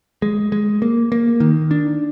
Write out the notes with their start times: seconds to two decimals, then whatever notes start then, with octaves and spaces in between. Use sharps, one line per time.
0.22 G#3
0.52 G#3
0.82 A#3
1.12 A#3
1.40 D#3
1.71 D4